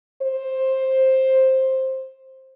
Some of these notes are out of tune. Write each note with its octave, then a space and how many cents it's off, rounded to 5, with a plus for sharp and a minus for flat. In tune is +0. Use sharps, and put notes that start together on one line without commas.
C5 +10